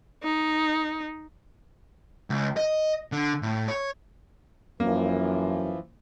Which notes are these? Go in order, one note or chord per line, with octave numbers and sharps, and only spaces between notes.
D#4
C#2
D#5
D3
A2
C#5
F#2 E3 F3 A#3